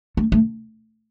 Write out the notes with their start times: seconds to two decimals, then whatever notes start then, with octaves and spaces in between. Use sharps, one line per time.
0.17 A3
0.32 A3